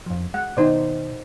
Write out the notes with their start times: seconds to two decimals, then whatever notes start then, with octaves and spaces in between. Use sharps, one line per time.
0.06 F2 F3
0.34 G#3 F#5
0.57 B2 D#3 D#4 C5 D5